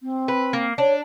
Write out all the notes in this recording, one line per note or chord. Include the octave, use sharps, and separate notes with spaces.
C4
B4
A#3
D4 C#5